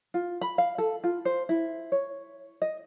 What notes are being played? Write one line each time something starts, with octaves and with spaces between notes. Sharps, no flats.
F4
B5
F5
A4
F4
C5
E4
C#5
D#5